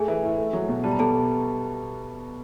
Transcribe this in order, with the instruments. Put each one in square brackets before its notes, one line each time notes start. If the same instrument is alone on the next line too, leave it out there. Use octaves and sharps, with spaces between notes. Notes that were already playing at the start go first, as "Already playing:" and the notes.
Already playing: [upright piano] A3 [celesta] G#4 G#5
[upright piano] E3
A2
A3
F#3
B2
[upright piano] G3 [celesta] A5
[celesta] A#5
[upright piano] B2 [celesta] A4 A5